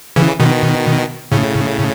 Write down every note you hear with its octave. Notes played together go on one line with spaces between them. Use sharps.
C#3 E3
B2 D#3
A2 C#3